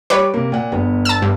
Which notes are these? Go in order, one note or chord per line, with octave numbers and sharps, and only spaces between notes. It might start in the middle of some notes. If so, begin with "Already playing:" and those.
G3 B4 C#5 D6
C3 A#3
A#2 F#5
G1 B3
A5 E6
G2